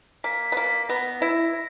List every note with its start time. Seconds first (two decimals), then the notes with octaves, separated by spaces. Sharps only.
0.24 A#3 B6
0.52 B3
0.57 A#3
0.89 B3 A#6
1.22 E4